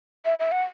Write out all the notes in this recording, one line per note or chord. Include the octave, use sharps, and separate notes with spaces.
E5
E5
F#5